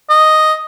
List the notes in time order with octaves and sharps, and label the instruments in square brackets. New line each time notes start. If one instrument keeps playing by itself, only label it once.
[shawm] D#5